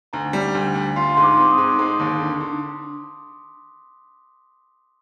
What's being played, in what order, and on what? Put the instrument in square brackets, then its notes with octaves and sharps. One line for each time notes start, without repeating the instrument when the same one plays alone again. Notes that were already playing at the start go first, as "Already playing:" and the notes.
[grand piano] D2 [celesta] A#5
[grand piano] G3
D2
D2
[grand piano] F4 [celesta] C6
[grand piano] G#2 [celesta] C6
[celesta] D6
[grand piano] C4
[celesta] D#6
[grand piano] G#2
G#3
D#2
D3
D3